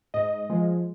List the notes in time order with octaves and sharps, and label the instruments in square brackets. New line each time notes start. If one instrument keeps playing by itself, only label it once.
[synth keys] G#2 D#5
F3 G#3